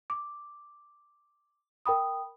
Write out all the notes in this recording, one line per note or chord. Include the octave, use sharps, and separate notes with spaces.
D6
A#4 G5 B5 D#6